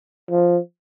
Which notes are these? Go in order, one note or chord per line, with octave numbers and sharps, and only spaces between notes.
F3